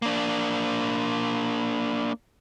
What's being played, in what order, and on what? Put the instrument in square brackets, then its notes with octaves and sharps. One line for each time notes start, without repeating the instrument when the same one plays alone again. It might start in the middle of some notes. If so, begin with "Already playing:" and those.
[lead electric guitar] A#3 D4